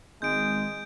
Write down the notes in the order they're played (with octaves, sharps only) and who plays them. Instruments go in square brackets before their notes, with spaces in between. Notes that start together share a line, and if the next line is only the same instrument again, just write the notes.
[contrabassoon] G#1 [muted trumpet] G#3 [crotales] G6 D7